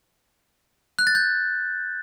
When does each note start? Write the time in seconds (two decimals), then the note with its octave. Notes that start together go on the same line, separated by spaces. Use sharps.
0.99 F#6
1.07 A6
1.15 G6